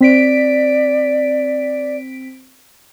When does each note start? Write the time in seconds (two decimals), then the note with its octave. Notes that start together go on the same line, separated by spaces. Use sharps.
0.01 C4 D5 B6 D7